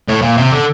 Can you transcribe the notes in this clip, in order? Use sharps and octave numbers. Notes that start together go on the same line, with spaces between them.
A2
A#2
C3
D3